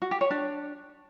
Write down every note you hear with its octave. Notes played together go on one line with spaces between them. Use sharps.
F#4
G4
C#5
D4